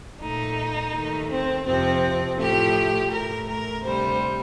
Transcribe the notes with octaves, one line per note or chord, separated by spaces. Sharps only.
A#2 A3 D#4
D#2 D#3 A3
C4
F2 C3 F3 C4
A2 F3 A3 G4
A2 A3 A#4
A#4
D2 C3 G3 C5